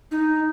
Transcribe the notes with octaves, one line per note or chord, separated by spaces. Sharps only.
D#4